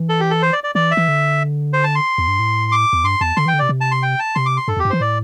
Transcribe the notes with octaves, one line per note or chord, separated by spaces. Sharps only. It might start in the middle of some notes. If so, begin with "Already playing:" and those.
Already playing: E3
A4
G4
A4
C5
D5
D5
E3 D5
E5
E3
D3
C5
A5
C6
E2
G2
A2
D6
E2
G2 C6
E2 A5
D3 C6
E3 G5
D3
C3 D5
C3
A5
C6
G5
A5
C3 C6
D6
C6
G2 A4
E2
G4
G2
E3 C5
A2 D5